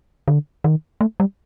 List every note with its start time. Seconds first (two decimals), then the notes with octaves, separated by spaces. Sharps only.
0.28 D3
0.64 D#3
1.01 A3
1.20 G3